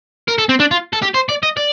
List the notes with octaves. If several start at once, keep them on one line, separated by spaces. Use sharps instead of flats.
A#4
A4
C4
D4
F4
A4
G4
C5
D5
D#5
D5